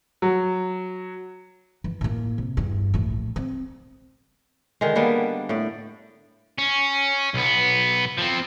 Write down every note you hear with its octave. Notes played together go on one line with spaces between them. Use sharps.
F#3
E3
A2 A#3
C3
E2 G2
A#1 A2
C4
D3 D#3 G#3
G3 A#3 B3 D4
A2 D5
C#4
B1 B3
F3 C4